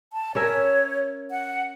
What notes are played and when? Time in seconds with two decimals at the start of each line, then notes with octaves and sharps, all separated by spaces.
0.13 A5
0.35 C#4 A#4 C#5 E5
1.31 F#5